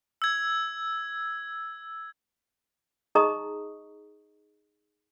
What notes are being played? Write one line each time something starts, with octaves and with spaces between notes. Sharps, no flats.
E6 G#6
D#4 G#4 D#5 A#5 C#6 D#6